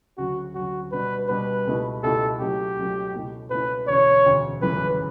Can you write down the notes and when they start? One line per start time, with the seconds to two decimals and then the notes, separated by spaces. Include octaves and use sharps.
0.17 D2 C#3 F#3 C#4 F#4
0.55 D2 C#3 F#3 C#4 F#4
0.92 B2 G3 D4 F#4 B4
1.29 B2 G3 D4 F#4 B4
1.65 C#2 B2 A3 E4 G4
2.03 C#2 B2 A3 E4 G4 A4
2.40 C#2 C#3 F#3 A3 G4
2.77 C#2 C#3 F#3 A3
3.14 C#2 B2 A3 C#4 E4
3.50 C#2 B2 A3 C#4 E4 B4
3.88 E1 D2 C#3 C#5
4.24 E1 D2 C#3
4.62 G1 F#2 C#3 E3 A3 B4